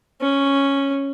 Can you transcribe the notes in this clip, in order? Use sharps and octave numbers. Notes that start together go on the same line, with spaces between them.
C#4